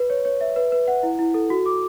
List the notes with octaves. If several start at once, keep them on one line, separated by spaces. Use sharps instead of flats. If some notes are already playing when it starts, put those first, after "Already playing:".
Already playing: B4
C#5
C#5
E5
B4
B4
F#5
E4
E4
A4
F#4
D6